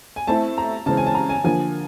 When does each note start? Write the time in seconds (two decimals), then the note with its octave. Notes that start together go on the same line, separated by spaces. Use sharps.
0.16 G#5
0.27 A3 C4 E4 A5
0.58 A#5
0.86 C#3 E3 G#3 C4 A5
0.97 G#5
1.06 A5
1.15 A#5
1.29 G#5
1.44 D3 F3 A#3 G#5